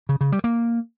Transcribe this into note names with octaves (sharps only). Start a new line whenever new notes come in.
C#3
C#3
G3
A#3